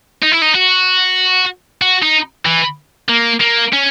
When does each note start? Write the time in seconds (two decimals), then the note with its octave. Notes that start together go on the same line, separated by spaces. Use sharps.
0.22 D#4
0.32 E4
0.42 D#4
0.55 F#4
1.82 F#4
2.02 D#4
2.46 E3
3.09 A#3
3.41 A#3
3.73 C#4